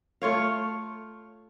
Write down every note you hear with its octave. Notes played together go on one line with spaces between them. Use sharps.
A3 F4 C#5 F5